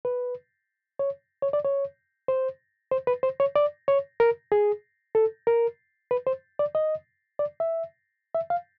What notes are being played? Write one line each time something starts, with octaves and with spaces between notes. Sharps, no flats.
B4
C#5
C#5
D5
C#5
C5
C5
B4
C5
C#5
D5
C#5
A#4
G#4
A4
A#4
B4
C5
D5
D#5
D5
E5
E5
F5